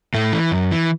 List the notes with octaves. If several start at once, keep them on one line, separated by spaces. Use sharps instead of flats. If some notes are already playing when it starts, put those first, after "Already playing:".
A2 A3
E3
F#2
E3